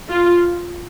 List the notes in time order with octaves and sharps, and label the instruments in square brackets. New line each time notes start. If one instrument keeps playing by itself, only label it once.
[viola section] F4